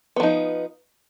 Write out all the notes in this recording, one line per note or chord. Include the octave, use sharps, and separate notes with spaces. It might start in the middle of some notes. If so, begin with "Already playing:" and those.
F3 B3 D#4